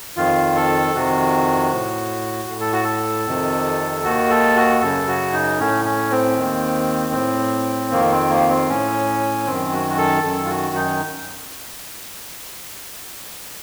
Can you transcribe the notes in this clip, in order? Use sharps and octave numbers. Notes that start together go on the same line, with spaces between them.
F2 D#3 F4
A4
F2 C3 D#3 F#4
A2
A2
A4
F#4
A4
F2 C3 D#3
D#2 D#3 F#4
A4
F#4
F#2 C#3 A4
F#4
D#4
A2 C#4
C#4
C4
D#2 D#3
A2
F2 D#3 A#3
C4
A#3
C4
A2 C#4
F#2 D#3 C4
F#4
F#4
A4
F#2 D#3 A4
F4
F#4
D#4